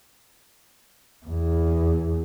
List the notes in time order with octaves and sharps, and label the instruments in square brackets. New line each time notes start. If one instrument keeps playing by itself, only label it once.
[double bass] E2